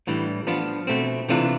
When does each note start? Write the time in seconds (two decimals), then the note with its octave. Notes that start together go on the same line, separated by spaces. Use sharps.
0.07 A2 E3 G3 D4
0.47 F3 B3 D4 F4
0.87 B2 A3 C4
1.29 C3 E3 A3 D4 F4